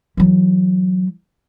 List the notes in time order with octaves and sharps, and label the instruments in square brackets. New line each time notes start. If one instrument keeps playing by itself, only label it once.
[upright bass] E3 F#3